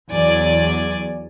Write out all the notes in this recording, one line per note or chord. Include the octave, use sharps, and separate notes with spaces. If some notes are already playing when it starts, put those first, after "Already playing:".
E2 F#3 D5 G#5